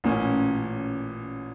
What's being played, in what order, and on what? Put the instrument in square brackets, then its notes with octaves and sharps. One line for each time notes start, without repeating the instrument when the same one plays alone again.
[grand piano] A1 A#2 C#4